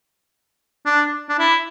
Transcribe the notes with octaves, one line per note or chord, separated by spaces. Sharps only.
D4
D4
E4